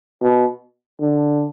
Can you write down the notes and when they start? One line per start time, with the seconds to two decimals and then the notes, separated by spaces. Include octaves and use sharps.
0.22 B2
1.00 D3